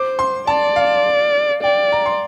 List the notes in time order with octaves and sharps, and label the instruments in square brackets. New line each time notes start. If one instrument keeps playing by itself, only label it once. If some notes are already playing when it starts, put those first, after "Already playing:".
Already playing: [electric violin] C5 [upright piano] D6
[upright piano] C6
[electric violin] D5 [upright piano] A5
[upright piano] F5
[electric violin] D5 [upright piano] G5
[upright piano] A#5
C6